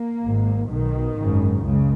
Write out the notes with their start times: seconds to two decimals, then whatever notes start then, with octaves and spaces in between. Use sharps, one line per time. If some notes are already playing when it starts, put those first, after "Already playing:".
Already playing: A#3
0.23 G#1 G#2
0.70 B1 B2 D#3
1.17 G#1 F#2 C#3
1.64 C#2 C#3